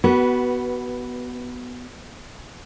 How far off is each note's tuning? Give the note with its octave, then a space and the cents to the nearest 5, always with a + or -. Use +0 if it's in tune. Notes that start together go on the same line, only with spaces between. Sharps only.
B3 +0 F#4 +25 B4 -15